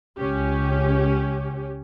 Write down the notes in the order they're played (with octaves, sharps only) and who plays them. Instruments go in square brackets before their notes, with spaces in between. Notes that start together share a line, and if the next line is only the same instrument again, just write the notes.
[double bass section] C#2 [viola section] C#4 G4